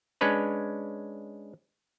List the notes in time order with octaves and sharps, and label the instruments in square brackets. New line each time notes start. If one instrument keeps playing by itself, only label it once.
[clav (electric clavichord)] G#3 C#4 D4 B4 C#5